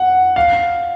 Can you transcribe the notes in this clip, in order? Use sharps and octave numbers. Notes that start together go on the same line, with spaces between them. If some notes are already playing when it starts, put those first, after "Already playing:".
Already playing: F#5
F5